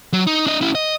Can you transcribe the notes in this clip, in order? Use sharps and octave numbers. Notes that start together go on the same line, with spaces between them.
F#3
D#4
D4 D#5
C#4 E4
D#5